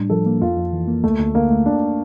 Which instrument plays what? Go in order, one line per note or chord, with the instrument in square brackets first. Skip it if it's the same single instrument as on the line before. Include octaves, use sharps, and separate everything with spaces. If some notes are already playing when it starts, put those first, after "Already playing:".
Already playing: [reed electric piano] A2 G3 D4
[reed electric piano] F3 [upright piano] A4
[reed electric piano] A#3
[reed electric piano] F2 [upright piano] F4
[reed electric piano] F2
E3
A#3
[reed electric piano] D2 [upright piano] A3
[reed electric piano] D2
[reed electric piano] D3 [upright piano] A#3
[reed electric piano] A3
[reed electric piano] A#3 [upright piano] D4